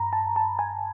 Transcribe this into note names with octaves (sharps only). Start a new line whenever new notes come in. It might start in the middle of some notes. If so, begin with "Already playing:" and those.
Already playing: G2 A#5 B5
A5
A5
G#5